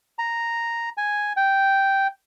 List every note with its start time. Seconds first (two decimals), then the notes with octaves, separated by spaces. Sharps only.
0.19 A#5
0.97 G#5
1.37 G5